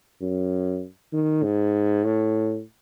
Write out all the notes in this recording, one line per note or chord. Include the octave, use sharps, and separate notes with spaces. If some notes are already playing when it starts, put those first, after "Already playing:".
F#2
D#3
G#2
A2